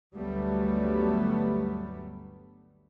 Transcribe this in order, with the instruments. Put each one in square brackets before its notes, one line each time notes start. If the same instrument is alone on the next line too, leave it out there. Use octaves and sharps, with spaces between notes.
[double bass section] G1 D2 F#3 G3 A3 B3